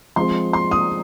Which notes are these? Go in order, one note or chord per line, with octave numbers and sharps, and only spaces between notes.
F3 G#3 C4 C6
C6
D#6